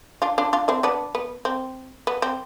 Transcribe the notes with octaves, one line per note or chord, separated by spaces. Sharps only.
D4 F4
D4 F4
D4 F4
C4 E4
B3 D4
B3
C4
B3
C4